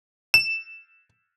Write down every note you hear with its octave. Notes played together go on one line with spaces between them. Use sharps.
E7